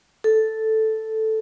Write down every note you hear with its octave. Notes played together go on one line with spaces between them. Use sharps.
A4